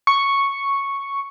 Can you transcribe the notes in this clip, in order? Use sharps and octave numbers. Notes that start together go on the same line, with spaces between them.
C#6